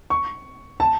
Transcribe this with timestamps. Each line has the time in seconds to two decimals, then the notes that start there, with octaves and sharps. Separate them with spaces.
0.10 C#6
0.80 A5